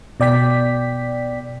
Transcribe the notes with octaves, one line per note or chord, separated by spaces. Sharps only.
B2 D5 G5 B6